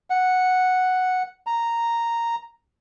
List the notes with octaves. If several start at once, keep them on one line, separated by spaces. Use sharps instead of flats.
F#5
A#5